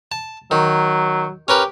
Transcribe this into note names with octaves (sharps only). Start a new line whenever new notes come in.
A5
D#3 F#3
C#4 G4 A#4 B4